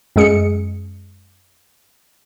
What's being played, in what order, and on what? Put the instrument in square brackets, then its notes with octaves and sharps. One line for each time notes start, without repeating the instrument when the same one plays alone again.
[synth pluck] F#2 G#3 G#4 C#7